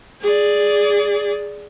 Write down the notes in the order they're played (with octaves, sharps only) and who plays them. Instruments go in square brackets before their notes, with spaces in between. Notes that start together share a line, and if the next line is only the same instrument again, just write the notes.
[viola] G#4 D5